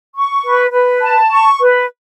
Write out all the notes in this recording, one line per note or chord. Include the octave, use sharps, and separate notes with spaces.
C#6
B4
B4
A5
C#6
B4